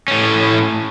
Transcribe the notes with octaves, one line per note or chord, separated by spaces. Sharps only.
A2 C#4